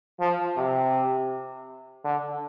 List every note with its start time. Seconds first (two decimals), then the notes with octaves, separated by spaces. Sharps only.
0.20 F3
0.57 C3
2.05 D3